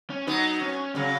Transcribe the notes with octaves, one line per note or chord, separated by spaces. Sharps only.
C#4
F#3 B3 D#4
C#4
C#3 F#3 C#4